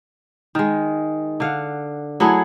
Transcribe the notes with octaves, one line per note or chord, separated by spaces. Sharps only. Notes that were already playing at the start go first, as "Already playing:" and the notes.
D#3 G#3
D3 F5 F#5
F#3 A3 E4 G#4